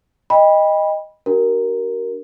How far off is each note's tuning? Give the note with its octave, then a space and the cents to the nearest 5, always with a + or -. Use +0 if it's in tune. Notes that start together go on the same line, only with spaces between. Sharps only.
D#5 +0 G5 +35 B5 -10
D4 +0 F#4 +45 A#4 +0